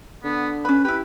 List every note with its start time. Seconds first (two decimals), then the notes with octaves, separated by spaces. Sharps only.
0.24 D3 B3
0.65 C#4 B4 B5
0.85 E4 G4 B4